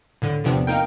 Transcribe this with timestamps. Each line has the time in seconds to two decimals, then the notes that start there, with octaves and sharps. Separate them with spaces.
0.22 A2 D3
0.44 E2 C3 F3 B3 C4 D4
0.67 A#3 D#4 A#4 G5